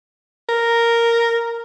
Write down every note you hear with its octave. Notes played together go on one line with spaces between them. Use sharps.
A#4